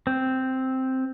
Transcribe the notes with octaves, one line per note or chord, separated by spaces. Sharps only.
C4